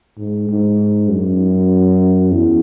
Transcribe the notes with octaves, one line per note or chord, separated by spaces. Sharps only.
G#2
G#2
F#2
E2